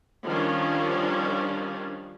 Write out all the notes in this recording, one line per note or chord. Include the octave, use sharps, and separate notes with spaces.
D#3 F3 G3 C#4 D4